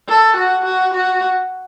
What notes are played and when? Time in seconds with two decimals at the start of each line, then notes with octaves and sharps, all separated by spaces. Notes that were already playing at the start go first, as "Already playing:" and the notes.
0.08 A4
0.36 F#4
0.64 F#4
0.94 F#4